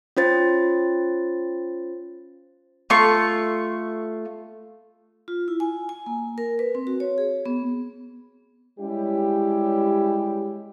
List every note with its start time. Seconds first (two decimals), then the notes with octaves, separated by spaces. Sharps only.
0.17 C#4 F4 C5 A6
2.90 A3 F4 C#6
5.28 F4
5.48 E4
5.60 G#5
5.89 G#5
6.06 A#3
6.38 A#4
6.59 B4
6.75 C4
6.87 F#4
7.00 C#5
7.18 G#4
7.46 B3
8.80 G3 G#3 C#4 E4 G4